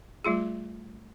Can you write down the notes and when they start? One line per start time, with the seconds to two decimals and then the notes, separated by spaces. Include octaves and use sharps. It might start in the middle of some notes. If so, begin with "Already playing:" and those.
0.25 G3 A3 F4 G#4